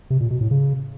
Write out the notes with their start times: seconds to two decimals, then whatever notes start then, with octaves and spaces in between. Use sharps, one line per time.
0.10 C3
0.21 A#2
0.31 B2
0.41 A2
0.51 C#3